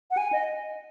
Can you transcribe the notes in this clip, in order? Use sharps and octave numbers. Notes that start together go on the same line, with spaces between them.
F#5
G#5
D#5